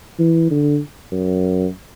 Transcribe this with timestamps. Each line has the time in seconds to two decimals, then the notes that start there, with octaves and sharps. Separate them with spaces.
0.19 E3
0.51 D3
1.12 F#2